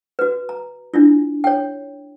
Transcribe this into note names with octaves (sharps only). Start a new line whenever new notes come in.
F#4 B4
A#5
D4 E4 F4
C#5 G5